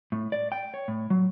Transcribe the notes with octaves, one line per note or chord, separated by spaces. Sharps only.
A2
D5
G5
C#5
A2
F#3